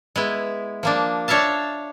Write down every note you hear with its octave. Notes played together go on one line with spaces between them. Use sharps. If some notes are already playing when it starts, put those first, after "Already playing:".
G#3 B3 E4
F3 A#3 D4
D4 C#5 E5 F5 A5